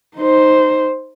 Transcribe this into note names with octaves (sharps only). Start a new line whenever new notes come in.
D#4 C5